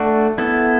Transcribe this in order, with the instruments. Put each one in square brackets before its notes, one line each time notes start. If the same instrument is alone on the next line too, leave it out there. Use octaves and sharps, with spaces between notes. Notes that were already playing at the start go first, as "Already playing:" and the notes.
Already playing: [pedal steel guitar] A3 D4 F#4
B3 E4 A4